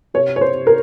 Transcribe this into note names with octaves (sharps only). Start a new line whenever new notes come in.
C3 C#5
C#5
C5
C3
A#4